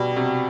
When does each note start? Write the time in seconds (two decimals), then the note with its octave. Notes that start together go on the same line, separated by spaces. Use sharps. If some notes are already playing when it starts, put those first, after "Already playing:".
Already playing: B2 G3
0.16 C3 F#4